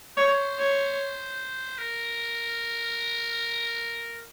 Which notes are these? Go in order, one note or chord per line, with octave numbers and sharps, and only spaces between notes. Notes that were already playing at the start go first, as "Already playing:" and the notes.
C5 C#5
C#5
A#4